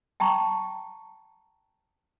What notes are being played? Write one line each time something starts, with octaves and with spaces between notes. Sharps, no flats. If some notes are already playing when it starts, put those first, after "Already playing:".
G5 A5 A#5 C#6